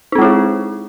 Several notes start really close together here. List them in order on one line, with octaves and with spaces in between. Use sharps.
D#4 C4 G#3 E4 G#4